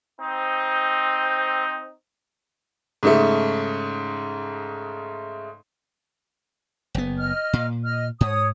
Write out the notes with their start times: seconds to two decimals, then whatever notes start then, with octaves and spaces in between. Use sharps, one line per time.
0.20 C4 D#4
3.03 G#2 C#3 A3
6.95 F#1 B3
7.19 D#5 F6
7.53 A#2
7.84 D#5 F6
8.21 G#2 C#5 D#6